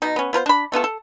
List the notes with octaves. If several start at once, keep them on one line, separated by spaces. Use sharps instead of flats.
B2 D#4
B3 C#4
B3 F4 A#4 C5
D4 B5
A3 B3 F4 A4
A4